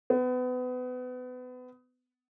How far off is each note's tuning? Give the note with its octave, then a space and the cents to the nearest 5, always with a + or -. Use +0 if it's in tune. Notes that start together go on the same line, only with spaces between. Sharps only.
B3 +30